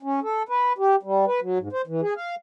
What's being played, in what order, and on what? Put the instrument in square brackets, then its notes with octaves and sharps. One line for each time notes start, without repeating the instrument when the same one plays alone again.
[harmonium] C#4
A4
B4
G4
G3
B4
F#3
G#2
C5
E3
G#4
F5